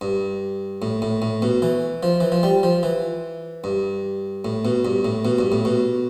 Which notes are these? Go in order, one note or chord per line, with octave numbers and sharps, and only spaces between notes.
G2
A2
A2
A2
B2
E3
F3
E3
F3
G3
F3
E3
G2
A2
B2
G2
A2
B2
G2
A2
B2